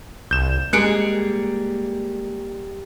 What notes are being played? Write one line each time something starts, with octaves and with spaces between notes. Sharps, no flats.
C2 G6 E7
G3 G#3 A#3 G#4 F#6 C#7 D7